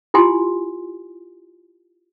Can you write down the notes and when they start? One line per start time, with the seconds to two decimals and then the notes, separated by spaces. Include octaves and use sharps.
0.14 E4 F4 G4 G#5 C6